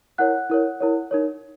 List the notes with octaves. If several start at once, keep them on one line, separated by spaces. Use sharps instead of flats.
E4 A#4 C#5 F#5 F#6
E4 A#4 C#5
E4 A#4 C#5
D#4 A#4 C#5